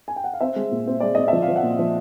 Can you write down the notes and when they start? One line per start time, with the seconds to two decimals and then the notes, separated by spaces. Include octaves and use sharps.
0.08 G#5
0.16 G5
0.24 F#5
0.33 F5
0.41 C4 E5
0.56 G#3
0.71 A#2
0.87 C4
1.00 G#3 D5
1.15 C4 D#5
1.28 F3 E5
1.42 F5
1.49 F3
1.56 F#5
1.63 A#2
1.79 F3